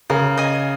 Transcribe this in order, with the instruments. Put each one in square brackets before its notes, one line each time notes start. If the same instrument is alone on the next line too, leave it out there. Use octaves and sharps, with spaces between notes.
[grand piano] C#3 [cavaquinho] A#4
[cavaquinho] D#5 G#5 D#6